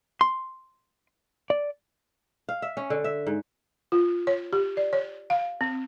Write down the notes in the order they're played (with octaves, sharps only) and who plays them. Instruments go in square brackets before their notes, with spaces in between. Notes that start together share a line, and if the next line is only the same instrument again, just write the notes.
[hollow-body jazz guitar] C6
D5
[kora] F5
E5
C#4
D3
E5
G#2
[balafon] F4
C#5
G4
D5
C#5
F5
C4